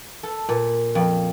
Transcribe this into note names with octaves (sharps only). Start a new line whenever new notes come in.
A4
A#2
F2